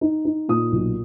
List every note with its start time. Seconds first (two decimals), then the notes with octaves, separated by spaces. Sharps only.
0.01 D#4
0.25 D#4
0.48 A#2 D#6
0.72 B1